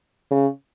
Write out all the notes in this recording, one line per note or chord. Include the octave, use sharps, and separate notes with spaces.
C#3